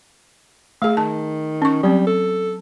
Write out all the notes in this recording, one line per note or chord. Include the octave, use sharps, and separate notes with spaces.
A3 G#4 F5
D#3 A5
C#4 C#6
F#3 G3 C4
A4